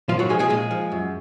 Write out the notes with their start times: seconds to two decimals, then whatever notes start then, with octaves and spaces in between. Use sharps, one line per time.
0.08 A#2 F3 F4
0.19 F#3 F#4
0.29 F3 G#3 G#4
0.39 G#3 G#4
0.50 A#2 G#3 G#4
0.71 F3
0.92 F#2